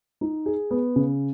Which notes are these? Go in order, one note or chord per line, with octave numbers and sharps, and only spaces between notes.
D#4
G#4
B3
C#3